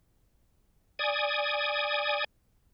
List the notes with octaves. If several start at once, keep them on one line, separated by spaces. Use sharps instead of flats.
D5 G#5 D#6